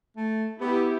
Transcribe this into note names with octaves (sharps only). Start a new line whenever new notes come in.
A3
B3 E4 G4